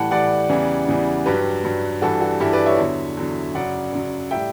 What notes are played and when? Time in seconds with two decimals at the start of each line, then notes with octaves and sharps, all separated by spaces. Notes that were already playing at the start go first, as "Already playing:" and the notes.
Already playing: A2 E3 G3 F#5 G5 A5 B5
0.11 A2 E3 G3 D5 F#5
0.49 E2 C#3 E3 G3
0.88 E2 C#3 E3 G3
1.25 G2 F#3 G4 B4
1.64 G2 F#3
2.02 G2 E3 G3 F#4 A4
2.21 F#4
2.40 G2 E3 G3 E4 G4
2.53 B4 D5
2.66 C#5 E5
2.78 E2 D3 F#3
3.17 E2 D3 F#3
3.54 F#2 C#3 F#3 D5 F#5
3.92 F#2 C#3 F#3
4.31 A2 G3 E5 G5